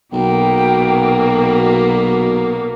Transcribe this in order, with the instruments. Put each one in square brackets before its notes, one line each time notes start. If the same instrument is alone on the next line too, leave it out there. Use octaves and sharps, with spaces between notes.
[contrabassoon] B1 [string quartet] B2 A#3 [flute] G5